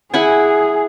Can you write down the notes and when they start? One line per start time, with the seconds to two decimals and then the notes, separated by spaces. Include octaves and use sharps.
0.14 E4 G#4 F#5 G#5